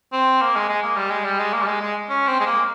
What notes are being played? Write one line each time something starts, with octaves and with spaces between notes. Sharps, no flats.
C4
A#3
G#3
G#3
A#3
G3
G#3
G3
G#3
A#3
G3
G#3
G#3
C#4
C4
G#3
A#3